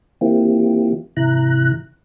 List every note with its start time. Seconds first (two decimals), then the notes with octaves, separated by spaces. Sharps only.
0.21 E3 A#3 C4 E4 F4 G4
1.17 G#2 C3 E3 E4 A#5 F#6